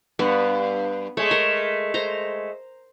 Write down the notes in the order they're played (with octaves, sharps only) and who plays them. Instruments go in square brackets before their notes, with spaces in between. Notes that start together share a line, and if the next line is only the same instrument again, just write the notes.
[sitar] G2 [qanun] B3
[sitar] G#3 A3 [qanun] C#5
[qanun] A#4
C5 A#5